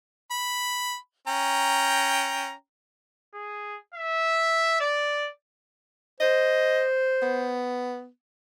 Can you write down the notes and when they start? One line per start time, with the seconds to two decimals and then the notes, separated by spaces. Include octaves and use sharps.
0.31 B5
1.27 C#4 G5 A#5
3.34 G#4
3.95 E5
4.81 D5
6.20 C5 D#5
7.22 B3